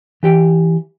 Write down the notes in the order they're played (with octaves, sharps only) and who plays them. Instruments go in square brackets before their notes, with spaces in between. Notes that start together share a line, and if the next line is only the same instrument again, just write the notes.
[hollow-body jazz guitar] E3 G4 G5